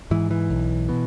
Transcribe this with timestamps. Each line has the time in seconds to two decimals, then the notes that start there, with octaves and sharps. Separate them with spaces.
0.11 G#2 E3
0.31 E3
0.50 B1
0.89 B2